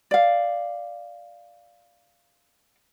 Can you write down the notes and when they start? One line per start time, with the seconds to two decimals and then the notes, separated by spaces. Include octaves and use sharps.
0.11 D5 F5